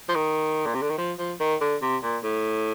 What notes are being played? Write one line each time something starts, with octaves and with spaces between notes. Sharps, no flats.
F3
D#3
A#2
C3
D3
D#3
F3
F3
D#3
D3
C3
A#2
A2